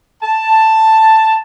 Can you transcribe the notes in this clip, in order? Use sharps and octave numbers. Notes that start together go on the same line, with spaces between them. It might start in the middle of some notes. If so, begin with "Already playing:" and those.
A5